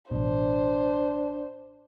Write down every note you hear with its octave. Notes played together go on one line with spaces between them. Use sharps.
A1 B2 D4 C5